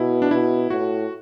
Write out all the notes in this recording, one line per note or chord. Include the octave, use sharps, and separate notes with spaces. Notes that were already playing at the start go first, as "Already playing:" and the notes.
Already playing: B2 E4
D4
B2 E4
A2 F#4